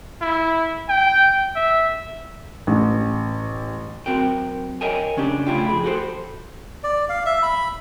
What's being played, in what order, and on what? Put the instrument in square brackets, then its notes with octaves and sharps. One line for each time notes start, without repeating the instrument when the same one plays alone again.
[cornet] E4
G5
E5
[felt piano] A1
[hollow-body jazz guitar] B1 C#3 C4 F#4 A#4 G5
A#4 C#5 D#5 E5 G5 G#5
C#3 C#4 D4 G4
A2 C#3 D4 E4 F4 G5
F2 G#4 B5
F#4 G4 A4 B4 C5
[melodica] D5
F5
E5
B5